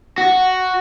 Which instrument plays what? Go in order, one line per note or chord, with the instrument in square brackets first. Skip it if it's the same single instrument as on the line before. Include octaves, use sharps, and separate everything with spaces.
[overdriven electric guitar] F#4